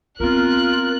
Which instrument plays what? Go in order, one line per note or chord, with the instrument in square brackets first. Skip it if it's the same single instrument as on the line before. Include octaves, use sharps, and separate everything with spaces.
[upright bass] B3 C4 [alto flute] F4 [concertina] A#4 [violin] F#6